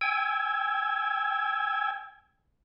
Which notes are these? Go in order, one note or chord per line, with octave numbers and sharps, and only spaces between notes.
G5 G#5 E6 G#6